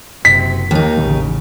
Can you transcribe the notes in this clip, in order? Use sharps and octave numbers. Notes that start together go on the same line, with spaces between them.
F#1 C3 B6
D#2 D#3 A#3 D#4
A1 C#3